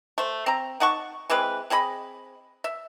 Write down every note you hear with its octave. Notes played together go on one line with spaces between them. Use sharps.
A3 C5
C4 A#5
D#4 F#5 A5 C#6
E3 G#3 C4 B4
C4 G#4 D#5 B5
E5